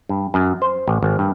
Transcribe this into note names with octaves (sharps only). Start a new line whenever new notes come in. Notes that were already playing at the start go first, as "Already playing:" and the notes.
G2
F#2
C5
A1
G#1
G2